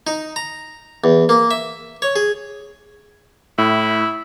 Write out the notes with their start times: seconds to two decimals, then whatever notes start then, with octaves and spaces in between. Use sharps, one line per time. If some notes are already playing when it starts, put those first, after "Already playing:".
0.07 D#4
0.36 A#5
1.04 E2
1.29 A#3
1.51 E5
2.02 C#5
2.16 G#4
3.58 A2 E4